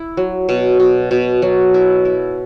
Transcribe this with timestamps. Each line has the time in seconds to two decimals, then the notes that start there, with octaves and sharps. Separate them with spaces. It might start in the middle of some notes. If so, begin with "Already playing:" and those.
Already playing: E4
0.17 F#3
0.49 B2
0.80 B2
1.11 B2
1.42 F#3
1.74 E4
2.05 E4